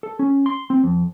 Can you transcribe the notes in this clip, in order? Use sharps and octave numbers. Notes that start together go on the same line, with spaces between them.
A4
C#4
C6
C4
F2